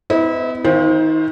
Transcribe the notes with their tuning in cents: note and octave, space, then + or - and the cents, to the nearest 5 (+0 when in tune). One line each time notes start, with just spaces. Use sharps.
B3 +40 E4 -30 D#5 +0
D#3 +35 F4 +0 C5 +5